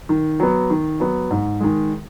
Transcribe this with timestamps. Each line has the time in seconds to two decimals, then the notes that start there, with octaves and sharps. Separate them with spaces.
0.09 D#3
0.40 F#3 B3
0.70 D#3
1.00 F#3 B3
1.31 G#2
1.60 D#3 G#3